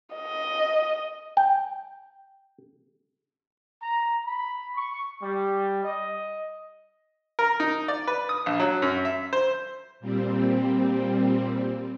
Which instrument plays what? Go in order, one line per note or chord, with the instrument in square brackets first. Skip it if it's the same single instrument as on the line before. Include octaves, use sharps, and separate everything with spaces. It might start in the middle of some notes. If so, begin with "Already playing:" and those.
[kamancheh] D#5
[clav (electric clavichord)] G5
[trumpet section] A#5
B5
C#6
G3
D#5
[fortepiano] A#4
D#4
D5
B4
D#6
A#1
F#3
F#2
E5
C5
[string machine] A#2 G3 C4